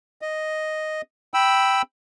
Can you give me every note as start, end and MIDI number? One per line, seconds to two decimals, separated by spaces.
0.22 1.01 75
1.34 1.82 79
1.34 1.82 83
1.34 1.82 88